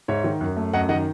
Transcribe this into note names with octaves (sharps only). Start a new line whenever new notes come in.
G#2 C#5 E5
D#3
F#2
A3
F#2 D#5 F#5
D#3 D#5 F#5